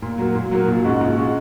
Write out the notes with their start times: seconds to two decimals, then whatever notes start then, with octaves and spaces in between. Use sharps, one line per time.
0.02 A#2
0.18 F#3 A#3
0.35 A#2
0.51 F#3 A#3
0.68 A#1
0.84 G#2 G#3 C#4 F#4
1.01 A#1
1.17 G#3 C#4 F#4